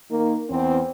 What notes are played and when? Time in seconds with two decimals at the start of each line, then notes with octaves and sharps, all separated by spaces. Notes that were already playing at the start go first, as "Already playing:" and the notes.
0.10 D#3 A#3
0.50 E2 C4